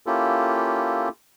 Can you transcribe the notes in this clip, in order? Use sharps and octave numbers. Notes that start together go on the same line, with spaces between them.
A#3 C#4 E4 F4 G4 A4